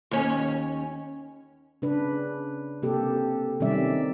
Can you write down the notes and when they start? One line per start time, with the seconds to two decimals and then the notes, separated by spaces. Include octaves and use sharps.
0.11 D#2 C#4
1.82 C#3 D4 B4
2.82 C3 A#3 G4 A4
3.60 C3 D#3 G3 C#4 D5 E5